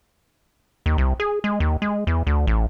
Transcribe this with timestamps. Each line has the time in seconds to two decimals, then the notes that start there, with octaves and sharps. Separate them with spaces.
0.86 D#2
0.98 C2
1.20 G#4
1.44 G#3
1.60 D#2
1.82 G#3
2.07 E2
2.27 D2
2.47 A1